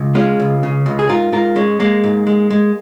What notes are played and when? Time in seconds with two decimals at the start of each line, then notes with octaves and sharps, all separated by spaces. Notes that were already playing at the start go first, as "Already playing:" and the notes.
Already playing: C#2
0.15 G#3 C#4 F4
0.40 C#2
0.63 C#3
0.86 C#2
0.99 G#4
1.09 G#2 F4 A#4
1.32 G#2 F4 A#4
1.56 G#3 C#4
1.80 G#3 A#3
2.04 G#2
2.27 G#3
2.50 G#3